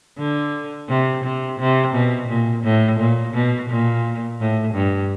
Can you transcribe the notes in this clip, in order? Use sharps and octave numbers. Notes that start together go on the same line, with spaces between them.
D3
C3
C3
C3
B2
A#2
A2
A#2
B2
A#2
A2
G2